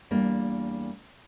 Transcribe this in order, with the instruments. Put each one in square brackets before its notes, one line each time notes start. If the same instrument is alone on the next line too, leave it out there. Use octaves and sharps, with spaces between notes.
[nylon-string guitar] E2 G3 A#3 D4